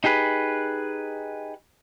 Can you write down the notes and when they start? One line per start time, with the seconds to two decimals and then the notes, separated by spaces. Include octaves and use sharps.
0.04 D#4 G4 G#4 B4